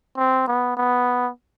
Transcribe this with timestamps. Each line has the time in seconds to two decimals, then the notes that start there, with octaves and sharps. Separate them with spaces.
0.17 C4
0.47 B3
0.77 B3